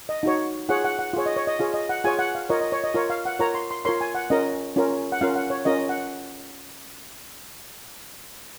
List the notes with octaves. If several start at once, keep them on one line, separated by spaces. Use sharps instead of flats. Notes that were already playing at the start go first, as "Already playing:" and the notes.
D#5
D#4 F#4 C#5
F4 G#4 C#5 F#5
F#5
F#5
F4 G#4 C#5
D#5
C#5
D#5
F4 G#4 C#5 F5
D#5
F#5
F4 G#4 C#5 G#5
F#5
F5
F4 A#4 C#5 D#5
D#5
C#5
D#5
F4 A#4 C#5 F5
F5
F#5
F4 A#4 C#5 A#5
C6
C6
F4 A#4 C#5 C6
G#5
F#5
C#4 F4 A#4 D#5
C#4 F4 A#4
F#5
C#4 F4 A#4 F5
F#5
C#5
C#4 F4 A#4 D#5
F#5